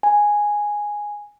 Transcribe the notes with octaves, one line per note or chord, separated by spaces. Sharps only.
G#5